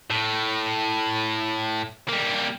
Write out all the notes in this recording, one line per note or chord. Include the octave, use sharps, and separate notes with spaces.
A2
G3 A#3